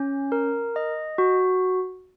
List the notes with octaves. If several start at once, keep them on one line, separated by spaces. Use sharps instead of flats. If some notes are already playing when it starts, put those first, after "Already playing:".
Already playing: C#4
A#4
D#5
F#4